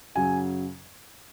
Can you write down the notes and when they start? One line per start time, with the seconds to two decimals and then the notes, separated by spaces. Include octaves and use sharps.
0.15 F#2 C#3 F#3 G#5